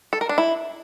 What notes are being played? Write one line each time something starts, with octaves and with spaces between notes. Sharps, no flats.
A4
A#4
D4
E4